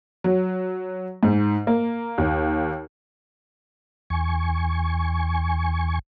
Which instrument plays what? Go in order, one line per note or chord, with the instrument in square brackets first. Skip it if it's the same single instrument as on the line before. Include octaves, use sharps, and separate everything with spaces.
[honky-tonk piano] F#3
G#2
A#3
D#2
[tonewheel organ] E2 G#5 C#6